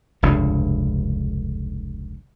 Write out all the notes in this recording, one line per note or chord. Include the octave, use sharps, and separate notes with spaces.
F1 C#2 G2 D3